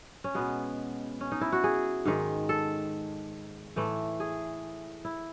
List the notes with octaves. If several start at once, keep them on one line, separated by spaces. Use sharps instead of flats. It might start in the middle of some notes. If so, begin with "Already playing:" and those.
C#4
B2 G#3 B3
C#4
D#4
E4
F#4
G#4
G#2 D#3 G#3
A4
A2 E3 A3
G#4
E4